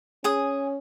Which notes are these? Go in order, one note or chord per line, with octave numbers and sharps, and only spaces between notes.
C#4 G#4 D#6